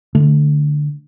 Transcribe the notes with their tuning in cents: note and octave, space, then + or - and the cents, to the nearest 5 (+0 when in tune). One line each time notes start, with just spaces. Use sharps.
D3 +5 A3 +0